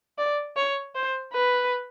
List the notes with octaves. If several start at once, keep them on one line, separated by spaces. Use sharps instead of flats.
D5
C#5
C5
B4